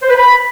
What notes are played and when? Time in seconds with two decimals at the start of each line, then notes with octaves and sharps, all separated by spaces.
0.03 C5
0.09 B4
0.16 B5